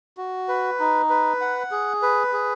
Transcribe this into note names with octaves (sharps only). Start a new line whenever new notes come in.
F#4
B4
D#4
B4
F#5
G#4
B4
G#4